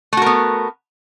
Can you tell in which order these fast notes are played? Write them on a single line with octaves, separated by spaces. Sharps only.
A3 F#4 A#4 B3